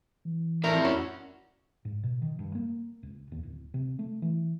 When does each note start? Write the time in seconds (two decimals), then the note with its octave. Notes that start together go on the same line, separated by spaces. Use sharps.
0.25 E3
0.64 F2 A2 E4 A#4 D5 E5
0.84 F2 C#4 F#4 F#5 E7
1.85 G#2
2.03 B2
2.22 D#3
2.39 G2
2.55 A#3
3.03 C#2
3.32 D#2
3.43 D1
3.74 C3
3.99 A3
4.22 E3